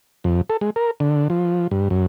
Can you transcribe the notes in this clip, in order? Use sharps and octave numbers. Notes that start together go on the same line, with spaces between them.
F2
A4
G#3
A#4
D3
F3
G2
F#2